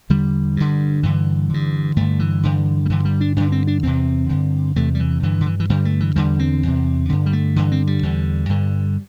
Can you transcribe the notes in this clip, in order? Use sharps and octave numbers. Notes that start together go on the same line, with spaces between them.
E2 D3 G3
G2 D3
G2 D3 E3
G2 D3
G2 D3 A3
E3
G2 D3
G3
G2 D3 E3
G3
D4
G2 D3 D4
C4
D4
E2 C3 C4
G2 D3
E2 C3 A3
G3
E3
G2 D3 E3
D3
E3
E3
G2 D3 G3
A3
E3
E2 D3 G3
C4
E2 C3
G2 D3
G3
A3
G2 D3 E3
C4
G3
E2 D3
G2 D3